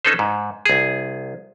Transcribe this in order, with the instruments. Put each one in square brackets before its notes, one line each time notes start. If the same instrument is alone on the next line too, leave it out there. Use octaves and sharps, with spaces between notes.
[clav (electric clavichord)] C#4 D#4 A4 B4 C5
G#2
C2 G#4